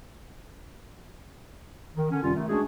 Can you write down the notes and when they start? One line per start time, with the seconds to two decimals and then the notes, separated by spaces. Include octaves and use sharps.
1.96 D#3
2.11 D3 C#4
2.23 F#2 C3 G3 C#4 F4
2.35 D#3 A3
2.48 G#3 A3 C#4 D4 F#4 G#4